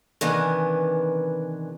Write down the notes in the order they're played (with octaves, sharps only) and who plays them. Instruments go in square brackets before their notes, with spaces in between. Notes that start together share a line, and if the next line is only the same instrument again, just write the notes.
[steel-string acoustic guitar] C3 D#3 E3 G#3 B3 D4